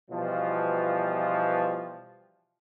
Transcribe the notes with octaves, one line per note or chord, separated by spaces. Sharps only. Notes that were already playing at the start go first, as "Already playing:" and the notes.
B2 E3 F3 G3 F4